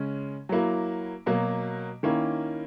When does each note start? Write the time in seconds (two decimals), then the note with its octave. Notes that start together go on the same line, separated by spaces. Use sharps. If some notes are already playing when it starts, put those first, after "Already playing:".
Already playing: C#3 G#3 C#4
0.49 F#3 A#3 E4
1.26 B2 F#3 A#3
2.03 D#3 A#3 C#4 E4